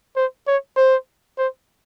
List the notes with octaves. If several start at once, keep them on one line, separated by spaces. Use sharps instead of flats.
C5
C#5
C5
C5